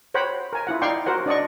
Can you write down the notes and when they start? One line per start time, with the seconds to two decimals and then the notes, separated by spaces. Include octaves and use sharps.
0.14 C5 C#5 F#5 G5 B5
0.53 A#4 G#5
0.67 E4 F4 F#5
0.82 D#4 D5 F5 G5 C6 C#6
1.06 F#4 A#4 C5 F#5
1.26 D4 D5 D#5 C#6